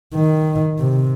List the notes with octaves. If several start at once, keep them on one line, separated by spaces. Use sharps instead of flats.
D#3
C3